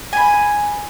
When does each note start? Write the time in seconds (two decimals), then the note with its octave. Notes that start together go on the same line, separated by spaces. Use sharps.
0.13 G#5 B5